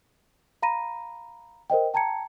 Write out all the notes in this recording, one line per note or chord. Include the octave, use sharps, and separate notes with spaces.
F5 A#5 B5 A#6 D#7
A#4 C5 D#5 G5
G5 A5 A#5 G#6 C#7